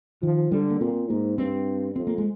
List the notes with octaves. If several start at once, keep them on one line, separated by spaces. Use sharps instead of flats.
D#3 F3
D3 G3
A#3
A#2 C4
G#2 A#3
G2 C4
F2 C4
A#3
G#3